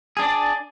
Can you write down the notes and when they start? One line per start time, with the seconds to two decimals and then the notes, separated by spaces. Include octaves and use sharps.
0.17 G#4
0.19 D4
0.22 D5